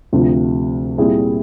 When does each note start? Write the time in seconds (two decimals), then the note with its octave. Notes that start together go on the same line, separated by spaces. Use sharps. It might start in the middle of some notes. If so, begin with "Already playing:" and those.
0.13 D2 C3 F3
0.98 A#2 G3 C4 E4 G#4